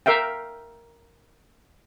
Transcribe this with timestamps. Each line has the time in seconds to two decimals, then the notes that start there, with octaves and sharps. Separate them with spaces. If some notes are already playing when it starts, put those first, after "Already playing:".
0.06 A#4 E5 F5 G5